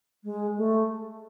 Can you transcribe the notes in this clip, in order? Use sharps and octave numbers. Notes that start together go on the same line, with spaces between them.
G#3
A3